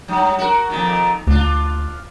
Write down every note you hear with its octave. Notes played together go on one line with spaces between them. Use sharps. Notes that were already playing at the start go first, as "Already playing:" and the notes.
G2 F#3
F#4 A#4
F2 A#2 D#3
D2 D4 F4